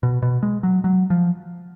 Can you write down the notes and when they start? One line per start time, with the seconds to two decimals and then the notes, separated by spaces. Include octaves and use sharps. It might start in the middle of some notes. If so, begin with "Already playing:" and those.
0.03 B2
0.22 B2
0.43 G#3
0.63 F#3
0.84 F#3
1.10 F3